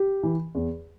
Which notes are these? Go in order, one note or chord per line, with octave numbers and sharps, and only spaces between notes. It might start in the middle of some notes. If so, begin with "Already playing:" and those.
Already playing: G4
E3
E2